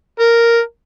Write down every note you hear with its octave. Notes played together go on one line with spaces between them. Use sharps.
A#4